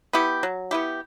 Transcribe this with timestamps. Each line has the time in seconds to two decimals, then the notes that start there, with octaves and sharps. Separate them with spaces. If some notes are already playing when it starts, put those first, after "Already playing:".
0.13 B3 E4 G4
0.43 F#3
0.71 B3 E4 G4